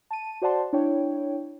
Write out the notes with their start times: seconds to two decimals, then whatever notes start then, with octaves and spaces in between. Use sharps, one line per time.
0.11 A5 D#7
0.42 F#4 C5 D5 F#5 A5 C6
0.73 D4 E4 C#5 G5